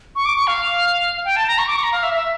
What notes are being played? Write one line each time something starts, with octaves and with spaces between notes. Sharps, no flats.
C#6
D6
C#6
F5
G5
A5
A#5
C#6
D6
C#6
A#5
F5
E5
E5